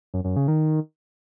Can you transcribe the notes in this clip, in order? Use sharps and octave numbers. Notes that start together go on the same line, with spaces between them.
F#2
F#2
C#3
D#3